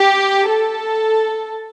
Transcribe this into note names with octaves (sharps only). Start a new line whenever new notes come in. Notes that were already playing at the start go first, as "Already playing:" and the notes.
Already playing: G4
A4